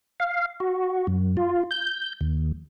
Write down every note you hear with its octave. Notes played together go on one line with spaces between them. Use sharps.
F5
F#4
F#2
F4
G6
D#2